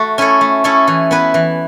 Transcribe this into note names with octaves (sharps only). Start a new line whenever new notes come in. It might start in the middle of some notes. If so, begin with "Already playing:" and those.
Already playing: A3 F#4
C#4 E4 A4 C#5
A3
C#4 E4 A4 C#5
E3
B3 E4 B4
E3